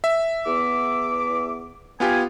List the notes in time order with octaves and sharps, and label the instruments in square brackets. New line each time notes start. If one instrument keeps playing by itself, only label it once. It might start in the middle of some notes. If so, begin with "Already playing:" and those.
[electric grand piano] E5
[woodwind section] E2 B3 D6
[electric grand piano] B3 F4 G4 [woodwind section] G#5